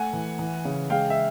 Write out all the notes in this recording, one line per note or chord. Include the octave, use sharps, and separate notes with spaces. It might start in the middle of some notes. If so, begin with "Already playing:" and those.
Already playing: A3 F#5 G#5
E3
E3
C#3
G#3 F5 G5
E5